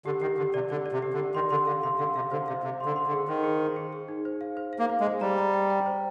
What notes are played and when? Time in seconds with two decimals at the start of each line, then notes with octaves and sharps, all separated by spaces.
0.06 D3 G4
0.21 D#3 G4
0.38 D3 G4
0.54 C3 D5
0.70 D3 D5
0.86 D5
0.92 C3
1.02 G4
1.13 D3
1.18 G4
1.35 D#3 C6
1.50 D3 C6
1.67 D3 F5
1.83 C3 C6
1.99 D3 F5
2.15 C3 F5
2.31 D3 C5
2.48 C3 F5
2.63 C3 C5
2.80 C6
2.86 D3
2.96 C6
3.07 D3
3.11 G#4
3.28 D#3 C5
3.44 G#4
3.60 C5
3.76 G#4
3.93 G#4
4.08 D#4
4.25 C5
4.41 F5
4.57 C5
4.73 F5
4.79 A#3
4.90 C5
5.00 G#3
5.05 C5
5.21 G3 A#5
5.38 A#5
5.54 G5
5.70 G5
5.86 C5